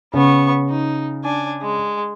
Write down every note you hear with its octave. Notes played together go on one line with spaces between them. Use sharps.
C#3 B3 C#6
D#4
D4 G#5
G#3